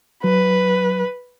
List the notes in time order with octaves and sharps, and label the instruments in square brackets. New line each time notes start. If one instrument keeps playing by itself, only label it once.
[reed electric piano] F#3 [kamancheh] B4